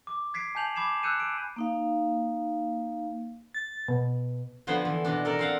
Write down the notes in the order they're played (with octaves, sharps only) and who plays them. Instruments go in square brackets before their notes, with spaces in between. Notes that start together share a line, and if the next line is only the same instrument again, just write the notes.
[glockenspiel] D6
G#6 B6 C7 D7
G#5 A5 G6 F7 F#7
B5 D6 G#6 C7 E7
E6 F#6 G6 C#7 D#7 E7
D7
[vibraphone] A#3 D#4 F5
[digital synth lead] A6
B2
[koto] D3 F3 B3 C5 G#5
E3
B2 E3 D4
A4 A#4 D5
C4 F5 F#5